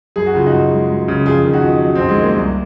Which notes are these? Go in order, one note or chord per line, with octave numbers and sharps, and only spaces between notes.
F#2 G#4
F#4
C#3 F4
D#4 F#4
F#2
G#3
F#2
C#3
F2 F4 G#4
D#3
D#4 F#4
F2
F#3
C4 D#4
F2
G#3
D#3 A#3
C2